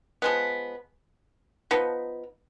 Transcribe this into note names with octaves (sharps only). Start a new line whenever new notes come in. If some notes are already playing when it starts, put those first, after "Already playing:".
F3 G#3 B3
F3 B3 D#4